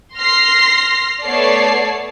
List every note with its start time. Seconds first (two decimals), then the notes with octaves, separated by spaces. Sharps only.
0.16 C6 F6 A#6 C7
1.24 A3 B3 A4 C#5 D5 C7